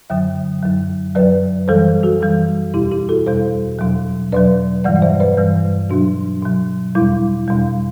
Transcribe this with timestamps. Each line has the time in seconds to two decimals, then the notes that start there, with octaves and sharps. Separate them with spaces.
0.10 F#2 D3 F#3 E5 G5
0.63 F#2 F#3
1.15 F#2 F#3 B4 D5
1.68 F#2 E3 G3 A4 C5
2.03 F#4 A4
2.21 F#2 E3 G3
2.74 E2 B2 G3 E4 G4
2.92 E4 G4
3.09 F#4 A4
3.27 E2 B2 G3 A4 C5
3.79 E2 B2 F#3
4.32 E2 B2 F#3 B4 D5
4.84 G2 E3 G3 D5 F#5
4.96 D5
5.02 C5 E5
5.20 B4 D5
5.37 G2 E3 G3
5.90 B2 F#3 D4 F#4
6.42 B2 F#3
6.95 E2 B2 G3 E4
7.48 E2 B2 G3